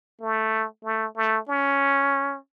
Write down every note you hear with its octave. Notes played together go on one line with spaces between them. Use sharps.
A3
A3
A3
C#4